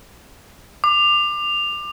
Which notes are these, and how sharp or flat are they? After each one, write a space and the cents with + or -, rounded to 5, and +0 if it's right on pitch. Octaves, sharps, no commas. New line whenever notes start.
D6 +25